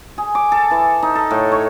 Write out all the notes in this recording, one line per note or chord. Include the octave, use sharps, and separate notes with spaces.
G#4
D6
A4
E3
D#4
A4
A2
C#5